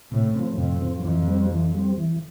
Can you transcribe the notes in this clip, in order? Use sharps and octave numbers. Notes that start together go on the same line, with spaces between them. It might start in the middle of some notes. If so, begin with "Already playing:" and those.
A2 C3
F3 C4
F2 C3
F3 C4
F2 E3
G3 C4
E3
G3 C4
E3